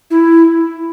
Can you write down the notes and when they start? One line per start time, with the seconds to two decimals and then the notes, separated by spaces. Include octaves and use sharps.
0.11 E4